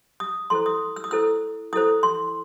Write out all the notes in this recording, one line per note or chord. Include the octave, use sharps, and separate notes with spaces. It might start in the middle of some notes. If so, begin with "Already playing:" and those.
D#6
E4 A4 C5 C6
D#6
E6
D#6
E4 A4 C5 E6
E4 A4 C5 D#6
C6